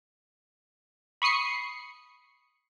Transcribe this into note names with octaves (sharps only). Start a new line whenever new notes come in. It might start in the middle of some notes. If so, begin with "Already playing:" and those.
B5 C#6 D#6 C7 C#7